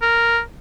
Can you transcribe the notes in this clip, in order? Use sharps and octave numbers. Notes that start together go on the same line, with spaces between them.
A#4